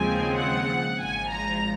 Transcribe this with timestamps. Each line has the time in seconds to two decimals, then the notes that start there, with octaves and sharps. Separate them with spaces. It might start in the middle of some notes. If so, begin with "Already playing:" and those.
Already playing: D#2 C#3 F3 G#3 C4 G#5
0.36 F#5
1.00 G#1 G#2 F3 G#5
1.31 A#5